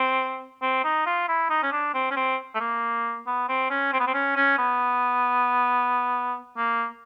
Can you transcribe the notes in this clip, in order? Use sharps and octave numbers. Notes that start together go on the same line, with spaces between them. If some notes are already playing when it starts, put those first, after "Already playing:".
Already playing: C4
C4
D#4
F4
E4
D#4
C#4
D4
C4
C#4
C4
A3
A#3
B3
C4
C#4
C4
B3
C4
C#4
C#4
B3
A#3